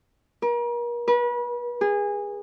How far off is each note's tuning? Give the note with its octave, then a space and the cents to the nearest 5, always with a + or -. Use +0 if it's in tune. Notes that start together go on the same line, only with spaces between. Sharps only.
A#4 +40
B4 -35
G#4 -25